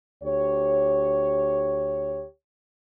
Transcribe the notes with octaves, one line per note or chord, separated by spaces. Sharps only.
D2 G4 C#5